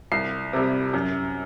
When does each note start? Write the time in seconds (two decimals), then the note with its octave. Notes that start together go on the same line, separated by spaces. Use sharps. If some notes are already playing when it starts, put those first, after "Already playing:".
0.12 C2 C7
0.53 C3 G3
0.94 F#2